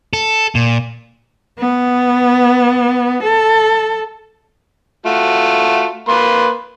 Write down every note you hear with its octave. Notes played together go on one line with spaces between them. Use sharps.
A4
A#2
B3
A4
A3 F4 F#4
A#3 B4 C6